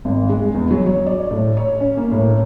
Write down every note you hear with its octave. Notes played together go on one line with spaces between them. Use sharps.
G#1
G#3
E2
F#3
C#5
D5
A2
C#5
C#4
A#3
A2